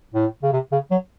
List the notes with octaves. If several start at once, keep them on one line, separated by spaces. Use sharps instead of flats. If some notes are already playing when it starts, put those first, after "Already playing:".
A2
C#3
C3
C#3
F#3